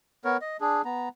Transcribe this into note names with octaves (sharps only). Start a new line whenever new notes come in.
B3 A#4 C#5
D#5
D4 G#4
B3 A#5